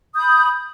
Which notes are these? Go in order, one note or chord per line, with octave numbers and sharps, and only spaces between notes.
B5 D#6 G6